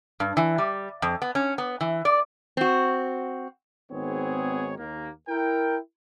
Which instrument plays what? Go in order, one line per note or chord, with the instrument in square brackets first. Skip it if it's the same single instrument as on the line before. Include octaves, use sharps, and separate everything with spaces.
[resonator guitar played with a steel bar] G2
E3
G3
F2
B3
C#4
B3
E3
D5
C4 F#4
[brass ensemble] G#1 D#3 B3 C4 G#4 C#5
D#2 A#3
E4 A#4 G5